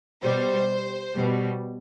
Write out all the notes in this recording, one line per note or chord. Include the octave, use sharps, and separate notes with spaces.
B2 G3 C5
B2 G3